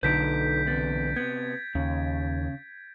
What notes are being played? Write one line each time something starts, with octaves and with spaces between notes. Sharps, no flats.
B1 D3 D#4 A4 B4 G6 B6 D7
E2 C3 B3 A6
C3 B3 G#6
D#2 C#3